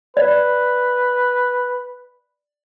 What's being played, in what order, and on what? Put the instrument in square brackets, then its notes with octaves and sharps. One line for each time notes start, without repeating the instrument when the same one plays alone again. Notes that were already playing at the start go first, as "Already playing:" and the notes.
[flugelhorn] B4 [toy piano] D5